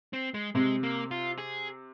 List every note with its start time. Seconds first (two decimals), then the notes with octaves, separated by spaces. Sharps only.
0.13 C4
0.34 G#3
0.55 C3 G#3
0.83 A#3
1.11 F4
1.38 G#4